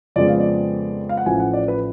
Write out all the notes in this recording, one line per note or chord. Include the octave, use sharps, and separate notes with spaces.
F2 C#3 F3 G#3 B3 D5
F5
D5
F5
F#5
A1 A2 F3 G#5
F#5
D5
B4